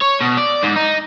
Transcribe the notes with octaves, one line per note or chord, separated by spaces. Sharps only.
C#5
B2
D5
G#2
D#4